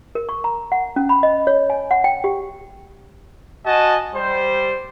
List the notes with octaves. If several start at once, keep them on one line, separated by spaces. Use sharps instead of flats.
A#4
C#6
A#5
F#5
C#4
B5
D#5
C#5
G#5
F#5
G5
G4
F#4 D#5 G#5 A5
G3 C5